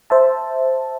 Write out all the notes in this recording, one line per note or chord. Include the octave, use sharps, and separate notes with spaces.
C5 E5 A5